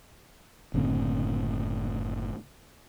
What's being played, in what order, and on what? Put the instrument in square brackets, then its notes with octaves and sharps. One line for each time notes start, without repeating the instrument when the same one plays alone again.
[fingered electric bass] F#1 A2 D3 C4